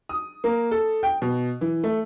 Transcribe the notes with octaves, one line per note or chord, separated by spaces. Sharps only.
D#6
A#3
A4
G5
B2
E3
A3